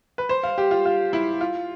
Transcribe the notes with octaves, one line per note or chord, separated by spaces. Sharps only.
B4
C5
F5
G4
F4
F4
E4
F4